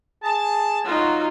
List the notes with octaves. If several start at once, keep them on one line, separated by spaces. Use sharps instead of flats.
G#4 A5
F#3 D#4 F4 F#4